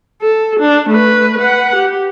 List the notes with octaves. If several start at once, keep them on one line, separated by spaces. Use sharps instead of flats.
A4
D4
A3 B4
B4 F#5
G4